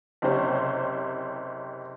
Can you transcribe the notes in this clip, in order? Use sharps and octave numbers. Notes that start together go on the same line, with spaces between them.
F#1 C3 C5 C#5